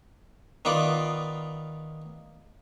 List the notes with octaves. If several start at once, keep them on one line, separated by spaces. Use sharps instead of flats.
D#3 B3 F4 D5